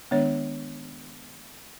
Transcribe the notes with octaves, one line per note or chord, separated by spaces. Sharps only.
D#3 G#3 B3 D4 C#5